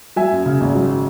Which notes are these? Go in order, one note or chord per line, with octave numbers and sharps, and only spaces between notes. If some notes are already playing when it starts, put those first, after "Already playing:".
F#3 E5 G#5
F#2
C#3
G#1
F#3